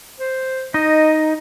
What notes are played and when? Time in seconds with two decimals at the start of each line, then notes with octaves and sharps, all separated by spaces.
0.20 C5
0.74 D#4 D#5